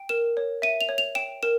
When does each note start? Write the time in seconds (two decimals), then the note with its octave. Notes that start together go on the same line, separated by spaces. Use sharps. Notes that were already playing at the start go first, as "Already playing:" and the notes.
Already playing: G5
0.09 A#4 E7
0.37 C#5
0.62 E5 D#7
0.81 F7
0.89 C#5
0.98 F7
1.15 G5 E7
1.43 A#4 E7